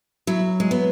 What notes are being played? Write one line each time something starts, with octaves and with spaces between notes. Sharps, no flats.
F#3 E4
G#3
B3